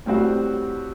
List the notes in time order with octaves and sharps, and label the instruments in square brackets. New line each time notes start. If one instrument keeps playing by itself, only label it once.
[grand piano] A2 G3 C4 F#4